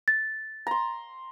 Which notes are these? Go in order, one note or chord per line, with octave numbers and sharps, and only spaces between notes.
A6
A#5 C6